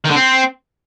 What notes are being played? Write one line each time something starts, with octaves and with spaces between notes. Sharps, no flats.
D#3
D3
C4